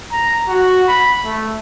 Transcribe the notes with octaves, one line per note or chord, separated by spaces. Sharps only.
A#5
F#4
B5
A3